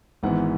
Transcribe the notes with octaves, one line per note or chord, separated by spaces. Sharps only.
G#1 G#2 E3 B3 F#5